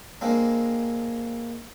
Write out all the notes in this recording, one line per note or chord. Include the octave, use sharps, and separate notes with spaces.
G#3 A#3 C4 D4